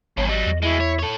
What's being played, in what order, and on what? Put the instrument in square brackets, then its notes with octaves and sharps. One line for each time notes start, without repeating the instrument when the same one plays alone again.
[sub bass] G#1 [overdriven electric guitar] E2 G2 [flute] C#5
[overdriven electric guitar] F#3 G3 [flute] D#5
[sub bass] E2
[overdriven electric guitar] B2 G#3 [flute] E4
[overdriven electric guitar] C#5
A4 C#5